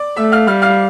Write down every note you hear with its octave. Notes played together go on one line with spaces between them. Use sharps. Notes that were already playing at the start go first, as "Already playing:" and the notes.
Already playing: D5 D6
A3 E5 E6
F5 F6
G3 F5 F6
F5 F6